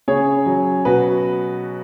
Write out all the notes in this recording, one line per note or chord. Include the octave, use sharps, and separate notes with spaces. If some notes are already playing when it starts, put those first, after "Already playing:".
C#3 G#4 C#5
F#3
B2 F#4 B4